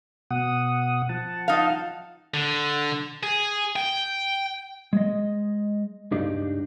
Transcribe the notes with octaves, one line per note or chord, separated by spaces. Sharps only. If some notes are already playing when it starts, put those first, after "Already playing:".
B2 F#5 D#6
F3 F#5 A5
D#4 F5
D3
G#4
G5
G#3 D#5
C#2 G2 D4 D#4 G4